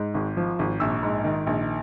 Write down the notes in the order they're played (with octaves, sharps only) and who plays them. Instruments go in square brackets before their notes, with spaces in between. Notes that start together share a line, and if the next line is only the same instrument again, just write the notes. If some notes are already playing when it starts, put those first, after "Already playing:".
Already playing: [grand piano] G#2
G#1
F3
G#1
A#1 E6
G#2
D#3
A#1